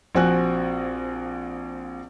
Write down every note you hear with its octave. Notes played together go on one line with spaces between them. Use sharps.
A#1 F3 C4 F#4 G#5 F#6